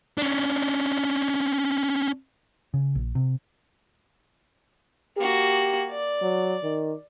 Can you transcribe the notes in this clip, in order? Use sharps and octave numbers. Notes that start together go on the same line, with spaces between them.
C#4 D4
C#3
A#1
C3
A#3 F#4 G4
D5
F#3
D#3